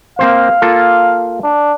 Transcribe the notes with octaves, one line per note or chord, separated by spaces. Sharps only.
A#3 C4 C5 F5
A#3 F4 A4
D4